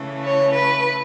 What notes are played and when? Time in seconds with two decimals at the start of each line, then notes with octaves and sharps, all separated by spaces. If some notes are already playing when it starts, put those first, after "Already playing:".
Already playing: C#3 E3 A3
0.23 C#5
0.53 B4